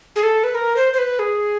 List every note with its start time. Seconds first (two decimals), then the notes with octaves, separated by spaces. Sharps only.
0.16 G#4
0.23 A4
0.44 B4
0.55 A#4
0.76 C5
0.93 C5
0.98 B4
1.19 G#4